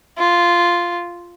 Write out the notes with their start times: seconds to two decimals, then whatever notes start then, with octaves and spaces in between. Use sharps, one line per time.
0.18 F4